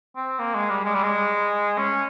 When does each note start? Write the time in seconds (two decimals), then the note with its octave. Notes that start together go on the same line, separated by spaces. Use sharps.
0.16 C4
0.39 A#3
0.55 G#3
0.69 G3
0.85 G#3
0.94 G3
1.03 G#3
1.78 C#4